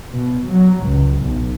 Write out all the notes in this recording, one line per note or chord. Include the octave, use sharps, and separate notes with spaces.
B2
F#3
C#2
B1